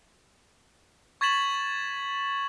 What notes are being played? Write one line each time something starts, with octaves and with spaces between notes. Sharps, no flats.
C#6 G#6 A6 B6 E7 F#7